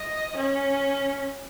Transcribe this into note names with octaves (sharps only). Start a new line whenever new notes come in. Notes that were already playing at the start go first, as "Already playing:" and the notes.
Already playing: D#5
C#4